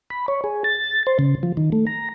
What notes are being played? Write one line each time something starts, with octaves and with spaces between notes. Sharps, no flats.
B5
C#5
G#4
A6
C5
C#3
F3
D#3
A3
A#5